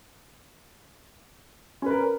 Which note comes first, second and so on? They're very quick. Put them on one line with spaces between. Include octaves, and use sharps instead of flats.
C#4 B4 A#4